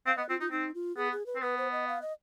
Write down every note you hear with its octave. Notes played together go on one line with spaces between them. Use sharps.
C4 F5
B3 D#5
C4 F4
D#4 F4
C4 D#4
F4
B3 G#4
G#4
B4
C4
B3 B4
C5
D#5
F5
D#5